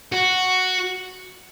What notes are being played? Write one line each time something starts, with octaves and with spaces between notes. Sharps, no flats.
F#4